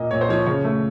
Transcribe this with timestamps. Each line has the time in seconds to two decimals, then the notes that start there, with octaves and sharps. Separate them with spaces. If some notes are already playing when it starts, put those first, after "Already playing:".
Already playing: A#2 A#3 D#5
0.11 A#2 C#5
0.21 C5
0.29 F3 C#5
0.46 C#3 C#5
0.64 A3